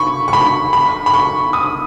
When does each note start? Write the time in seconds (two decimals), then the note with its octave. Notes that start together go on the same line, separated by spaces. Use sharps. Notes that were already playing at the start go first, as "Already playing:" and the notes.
Already playing: B5 C#6
0.28 C#6
0.33 B5
0.73 B5
1.06 B5
1.13 C#6
1.53 D#6